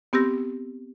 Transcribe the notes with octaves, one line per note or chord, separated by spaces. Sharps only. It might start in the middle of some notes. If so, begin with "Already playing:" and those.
B3 C4 G4 E6 A#6